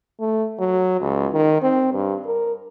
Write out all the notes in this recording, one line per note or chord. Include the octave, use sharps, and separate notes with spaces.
A3
F#3
C#2
D#3
C4
G2
A#4